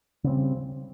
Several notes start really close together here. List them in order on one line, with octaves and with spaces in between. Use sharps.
C#3 C4 G3